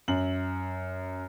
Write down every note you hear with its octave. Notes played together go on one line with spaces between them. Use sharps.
F#2 F#7